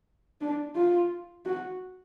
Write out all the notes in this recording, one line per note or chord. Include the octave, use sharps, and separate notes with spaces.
D4
F4
F#4